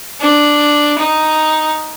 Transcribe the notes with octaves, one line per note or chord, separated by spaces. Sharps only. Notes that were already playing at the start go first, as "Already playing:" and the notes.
D4
D#4